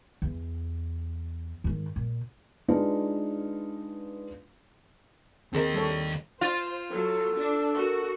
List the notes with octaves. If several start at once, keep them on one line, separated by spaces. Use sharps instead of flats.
E2
G#2 D#3
A#2
G#3 D4 D#4 F4 B4 F5
D#2 C4 G#4 A#4 D#5
G3 A4 C#5
F4 C5
F#3 A4
D4
F#4 A#4